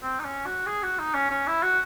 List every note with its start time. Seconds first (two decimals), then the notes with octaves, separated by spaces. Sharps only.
0.02 C4
0.19 D#4
0.24 C#4
0.46 F#4
0.66 G#4
0.83 F#4
0.99 D#4
1.14 C#4
1.30 C#4
1.47 E4
1.63 F#4